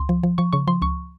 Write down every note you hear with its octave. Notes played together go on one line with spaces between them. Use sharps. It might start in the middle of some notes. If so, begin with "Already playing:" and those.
Already playing: C#2 C6
F3
F3
F3 C#6
C#3 C#6
F3 C6
C#2 C#6